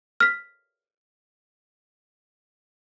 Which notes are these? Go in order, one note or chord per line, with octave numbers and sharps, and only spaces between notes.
F6 B6